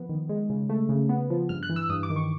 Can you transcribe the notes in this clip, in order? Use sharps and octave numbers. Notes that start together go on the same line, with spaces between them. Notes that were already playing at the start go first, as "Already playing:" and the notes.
Already playing: F3 B3
D#3
G#3
C#3
A3
C#3
B3
F3
G2 F6
F#6
E3
E6
G2 D#6
D6
D#3
C#6